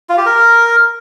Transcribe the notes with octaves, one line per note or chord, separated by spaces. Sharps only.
F4
G4
A#4